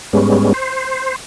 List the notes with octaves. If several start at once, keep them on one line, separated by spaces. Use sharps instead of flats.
G#2 G3 G#3 B3 C#4
C5